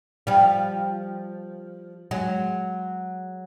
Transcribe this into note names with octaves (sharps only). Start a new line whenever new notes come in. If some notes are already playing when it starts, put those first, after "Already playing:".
F3 G3
F#3 G#3